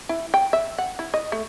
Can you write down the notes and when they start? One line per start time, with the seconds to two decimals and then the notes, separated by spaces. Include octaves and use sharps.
0.09 E4
0.34 G5
0.53 E5
0.78 F#5
0.99 E4
1.14 D#5
1.32 A3